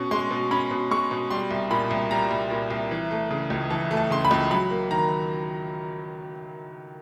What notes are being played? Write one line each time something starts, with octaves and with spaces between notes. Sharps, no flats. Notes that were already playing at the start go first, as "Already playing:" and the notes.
Already playing: B2 C#4 C#6
G#3 C6
B2
C#4 B5
B2
G#3 C#6
B2
G3 C6
C2
A#2 B5
C2
G3 A#5
C2
A#2
C2
E3
A3
C#3
C#2
E3 A5
A3
A5
C#3 C6
B5
C#2
F#3 B5
A#3
D#3 A#5